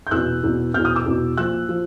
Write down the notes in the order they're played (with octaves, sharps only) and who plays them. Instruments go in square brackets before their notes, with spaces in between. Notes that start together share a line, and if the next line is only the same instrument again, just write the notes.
[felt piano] G6
E2 B2 E6 F#6
E2 B2
E2 B2 F6 G6
D#6 F6
D6 E6
E2 B2
A#2 F3 E6 F#6
F3